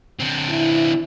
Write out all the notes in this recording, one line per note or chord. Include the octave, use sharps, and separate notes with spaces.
D3 C4
E4